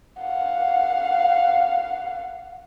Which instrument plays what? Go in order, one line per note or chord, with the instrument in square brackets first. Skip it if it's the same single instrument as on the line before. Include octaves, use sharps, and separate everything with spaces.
[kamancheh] F5 F#5